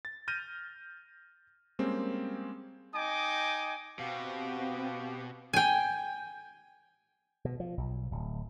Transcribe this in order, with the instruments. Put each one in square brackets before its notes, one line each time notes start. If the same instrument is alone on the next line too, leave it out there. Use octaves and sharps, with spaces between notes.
[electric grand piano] A6
F6 G6 A#6 D#7
G3 G#3 A#3 C4 C#4
[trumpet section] D#4 D#5 G5 G#5 D6
[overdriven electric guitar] B2 [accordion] B3 F#4 G4 [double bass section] C4 [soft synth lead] F5
[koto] G5 G#5
[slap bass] B2
F3
B1
D1